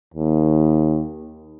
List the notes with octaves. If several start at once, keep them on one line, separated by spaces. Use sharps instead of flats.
D#2